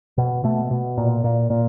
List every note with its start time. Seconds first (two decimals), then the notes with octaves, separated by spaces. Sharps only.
0.18 B2
0.44 B2 A3
0.71 B2
0.98 A#2
1.24 A#2
1.50 A#2